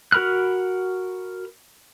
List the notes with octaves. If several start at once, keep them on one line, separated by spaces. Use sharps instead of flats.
F#4 A#4 B5 F6 F#6